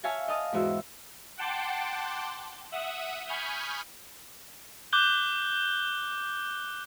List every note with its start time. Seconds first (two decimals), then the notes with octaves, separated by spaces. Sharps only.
0.04 C#5 E5 F5 G#5 A5
0.28 D#5 F5 A5 D#6
0.53 E2 G#2 F#4 E5
1.37 F#5 G5 A5 C6 D6
2.72 E5 F#5 D#6
3.27 G#5 B5 C#6 D#6 F6 G6
4.93 D6 F#6 G6 G7